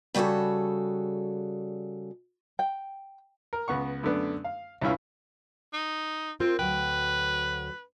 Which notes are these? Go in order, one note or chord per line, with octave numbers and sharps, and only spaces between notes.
C#3 G3 F#4 G#4 A4
G5
A#4
C#2 B3 F#5 C#6
F#2 D3 A3 B3 D4
F5
C2 G2 C#4 E4 F4
D#4
C4 F4 A#4
D2 F#3 B4 G5